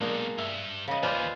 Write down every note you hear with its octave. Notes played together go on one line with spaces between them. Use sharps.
B1 G#3 A#3 D4
G2 E5
C#3 D#5
D#2 F4 B4 C5 D5 G#5